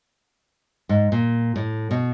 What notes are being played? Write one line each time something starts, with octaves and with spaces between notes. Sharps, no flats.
G#2
A#2
A2
B2